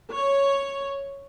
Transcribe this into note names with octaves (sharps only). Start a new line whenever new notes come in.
C#5